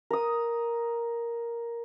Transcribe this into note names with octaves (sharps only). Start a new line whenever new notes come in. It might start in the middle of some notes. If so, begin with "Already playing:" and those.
A#4 D#6